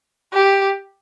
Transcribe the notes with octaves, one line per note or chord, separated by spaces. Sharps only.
G4